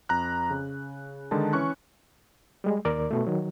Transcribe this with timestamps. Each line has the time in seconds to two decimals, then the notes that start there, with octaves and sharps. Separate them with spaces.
0.09 F2 A#5 F#6
0.50 C#3
1.31 D3 D#3 G#3 D#4 A5
1.53 E3 C#4 C#6 F#6
2.64 G3 G#3
2.85 D#2 A#4 D5
3.11 B2 A3
3.27 D#3 F#3